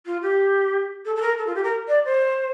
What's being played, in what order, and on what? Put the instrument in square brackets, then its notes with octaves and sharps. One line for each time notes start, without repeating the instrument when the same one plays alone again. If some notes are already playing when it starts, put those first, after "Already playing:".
[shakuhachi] F4
G4
A4
A4
A#4
A4
F4
G4
A#4
D5
C5